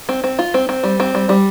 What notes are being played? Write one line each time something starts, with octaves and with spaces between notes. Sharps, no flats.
C4
C4
F4
C4
C4
G3
C4
G3
G3